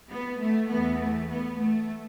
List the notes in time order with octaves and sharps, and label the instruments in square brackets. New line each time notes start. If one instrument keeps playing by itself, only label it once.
[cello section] B3
A3
E2 E3 B3
A3
B3
A3